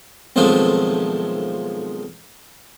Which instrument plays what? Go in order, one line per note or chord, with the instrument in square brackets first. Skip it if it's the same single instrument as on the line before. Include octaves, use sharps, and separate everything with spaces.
[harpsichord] B1 F2 D#3 F3 G#3 A3